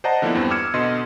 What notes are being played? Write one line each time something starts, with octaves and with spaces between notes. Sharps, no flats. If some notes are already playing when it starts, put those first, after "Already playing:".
C5 D5 D#5 F#5 A5 A#5
D3 F3 A#3 B3 D4 E4
E2 G2 C4
D6 E6 F6 G#6 C#7 E7
B2 D3 D#5 C6 C#7